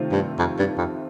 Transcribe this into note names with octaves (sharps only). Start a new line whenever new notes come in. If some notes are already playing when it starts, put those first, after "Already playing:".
Already playing: C3 D#3 A3 C4 F4
G2
F2
G2
F2